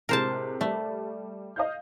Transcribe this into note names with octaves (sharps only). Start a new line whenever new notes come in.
A2 C3 G#3 A#4 C5 A5
G3 A3
D#5 F5 G6